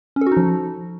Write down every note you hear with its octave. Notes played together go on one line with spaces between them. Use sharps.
C#4
A4
F#4
D#4
F3